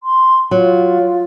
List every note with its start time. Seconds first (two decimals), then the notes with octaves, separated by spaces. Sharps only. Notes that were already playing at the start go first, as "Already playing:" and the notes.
0.03 C6
0.51 F#3 F4